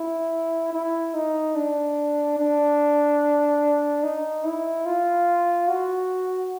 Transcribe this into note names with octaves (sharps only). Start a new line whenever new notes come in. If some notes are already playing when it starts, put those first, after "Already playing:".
Already playing: E4
E4
D#4
D4
D4
D#4
E4
F4
F#4